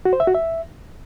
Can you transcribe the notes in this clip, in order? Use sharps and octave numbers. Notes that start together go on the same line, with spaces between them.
F#4
C5
E5
F#4
E5